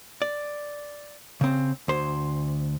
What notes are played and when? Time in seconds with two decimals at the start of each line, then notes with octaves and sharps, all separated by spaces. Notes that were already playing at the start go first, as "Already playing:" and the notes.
0.22 D5
1.41 C#3 C4
1.88 D2 C5